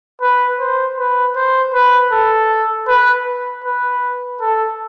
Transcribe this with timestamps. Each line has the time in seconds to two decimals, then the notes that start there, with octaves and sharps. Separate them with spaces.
0.22 B4
0.60 C5
0.99 B4
1.36 C5
1.74 B4
2.12 A4
2.88 B4
3.65 B4
4.41 A4